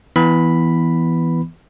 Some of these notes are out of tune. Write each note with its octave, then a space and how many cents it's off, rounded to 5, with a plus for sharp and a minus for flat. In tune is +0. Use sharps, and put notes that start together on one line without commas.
E3 +0 B3 +0 B5 +0